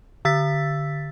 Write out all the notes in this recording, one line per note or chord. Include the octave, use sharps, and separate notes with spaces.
D3 E6 A6 B6